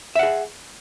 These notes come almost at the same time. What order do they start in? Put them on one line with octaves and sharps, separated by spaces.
E5 F#5 G#4